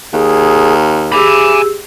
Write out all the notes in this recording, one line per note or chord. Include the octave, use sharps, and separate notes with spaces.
D#2 G#4
G4 G#4 G#5 B5 D6 E6